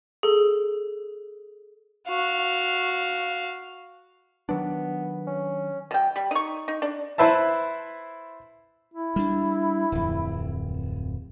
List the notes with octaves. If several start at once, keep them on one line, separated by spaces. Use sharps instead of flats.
G#4 A4
F#4 F5
D#3 F#3 B3 D4
C#4
B2 G5
G3
D#4 C#6
D#4
D4
E4 B4 C5 E5 A5
E4
G3 D4
D1 F2